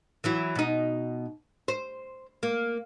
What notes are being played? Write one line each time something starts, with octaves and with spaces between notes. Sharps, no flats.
E3 F#3 E4
B2 D#4
C5
A#3